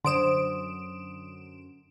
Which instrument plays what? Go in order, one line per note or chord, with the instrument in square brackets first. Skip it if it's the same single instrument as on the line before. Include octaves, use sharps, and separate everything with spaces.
[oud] F#2 C5 [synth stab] D3 D7 E7 [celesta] C6 D#6